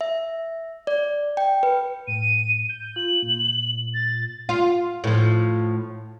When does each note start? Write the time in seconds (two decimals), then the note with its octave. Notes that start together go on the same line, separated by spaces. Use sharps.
0.01 E5
0.87 D5
1.37 G5
1.63 B4
2.07 A2 D#7
2.69 G6
2.96 F4 F#7
3.23 A#2
3.94 A6
4.49 F4
5.04 A2 F3